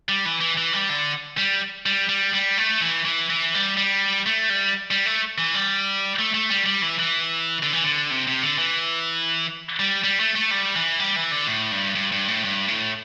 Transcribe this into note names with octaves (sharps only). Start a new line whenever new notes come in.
G3
E3
E3
E3
G3
D3
G3
G3
G3
G3
A3
E3
E3
E3
G3
G3
A3
G3
G3
A3
E3
G3
A3
A3
G3
G3
E3
E3
D3
E3
D3
C3
C3
D3
E3
G3
G3
A3
A3
G3
E3
G3
E3
D3
A2
G2
G2
G2
A2
G2
A2